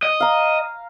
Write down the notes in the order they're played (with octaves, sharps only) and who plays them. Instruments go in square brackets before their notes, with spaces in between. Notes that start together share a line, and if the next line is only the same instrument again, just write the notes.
[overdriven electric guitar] D#5
[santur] F5 A#5